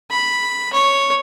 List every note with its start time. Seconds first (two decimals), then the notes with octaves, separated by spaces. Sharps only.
0.10 B5
0.73 C#5